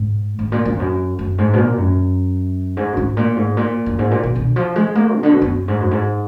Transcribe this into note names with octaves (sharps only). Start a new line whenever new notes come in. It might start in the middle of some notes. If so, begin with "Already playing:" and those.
Already playing: G#2
G#2
A#2
G#2
F2
F#2
F#2
G#2
B2
A#2
F#2
G#2
F#2
G#2
A#2
G#2
A#2
F#2
G#2
A#2
B2
D3
F3
G#3
A#3
B2
D3
B2
F#2
G#2
F#2
G#2